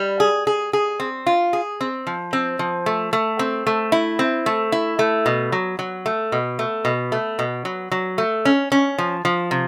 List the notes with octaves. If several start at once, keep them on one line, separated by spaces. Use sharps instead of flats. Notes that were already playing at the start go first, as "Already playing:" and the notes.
Already playing: G3
G#4
G#4
G#4
C4
F4
G#4
C4
F3
C4
F3
A3
A3
C4
A3
E4
C4
A3
E4
A3
B2
F#3
F#3
A3
B2
A3
B2
A3
B2
F#3
F#3
A3
C#4
C#4
F3
F3
C3